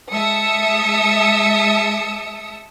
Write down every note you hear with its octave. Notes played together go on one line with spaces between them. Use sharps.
G#3 E5 A5 D#6 E6 C#7